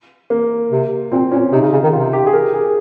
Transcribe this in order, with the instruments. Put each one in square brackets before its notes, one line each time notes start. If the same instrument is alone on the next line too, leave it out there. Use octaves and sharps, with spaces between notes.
[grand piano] A#3
[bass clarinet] C3
[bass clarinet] A#2 [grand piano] C4
[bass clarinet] A#2 [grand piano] C#4
[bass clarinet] C3 [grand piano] D#4
[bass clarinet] C#3
C#3
D#3
[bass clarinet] C3 [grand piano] F4
[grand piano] G4
G#4
A#4
G#4